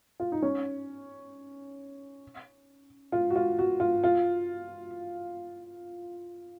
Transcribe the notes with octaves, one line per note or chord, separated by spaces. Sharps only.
F4
D#4
C#4
F4
F#4
F4
F#4
F4
F4